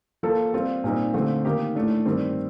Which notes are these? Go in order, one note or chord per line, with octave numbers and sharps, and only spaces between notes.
F3 A#3 F4 A4
G3 C4 F4
A#2 G3 C4 D#4
D3 F3 A3 C4
D#3 A#3 D#4 G4
A2 A3 D4
G2 D#3 G3 C4 G4